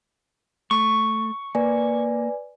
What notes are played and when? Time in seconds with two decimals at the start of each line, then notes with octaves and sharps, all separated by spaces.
0.71 A3 C#6
1.55 A#3 B4 D5 G#5